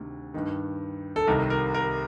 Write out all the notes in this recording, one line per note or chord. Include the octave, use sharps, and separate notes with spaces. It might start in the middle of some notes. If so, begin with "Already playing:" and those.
Already playing: D2 C3 D#3
G2 D#3
A4
C2 C3 D#3 A#4
A#4
A#4